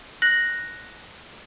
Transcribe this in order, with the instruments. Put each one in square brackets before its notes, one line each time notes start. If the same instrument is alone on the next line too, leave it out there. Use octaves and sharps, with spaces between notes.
[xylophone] F#6 A#6 F#7